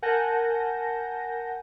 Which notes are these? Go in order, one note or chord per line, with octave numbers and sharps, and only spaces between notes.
A#4 F#5 G#5 A5 G6 A#6